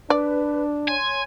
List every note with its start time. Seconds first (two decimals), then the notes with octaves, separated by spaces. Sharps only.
0.10 D4 B4 D5
0.88 C#5 G#5 C6